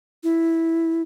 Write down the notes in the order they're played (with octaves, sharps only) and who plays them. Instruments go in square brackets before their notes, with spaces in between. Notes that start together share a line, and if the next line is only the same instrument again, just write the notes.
[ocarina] E4